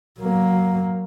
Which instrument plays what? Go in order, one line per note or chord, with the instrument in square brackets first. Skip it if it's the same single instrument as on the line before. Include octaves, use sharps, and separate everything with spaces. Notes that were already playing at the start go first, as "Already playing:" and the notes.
[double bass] F#3 A#3